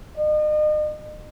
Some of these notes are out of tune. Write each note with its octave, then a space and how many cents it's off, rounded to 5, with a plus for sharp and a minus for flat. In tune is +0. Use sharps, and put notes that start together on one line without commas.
D#5 -40